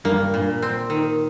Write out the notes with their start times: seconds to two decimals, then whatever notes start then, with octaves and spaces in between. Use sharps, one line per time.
0.05 G2 A#3
0.34 A#2
0.62 C4
0.90 D#3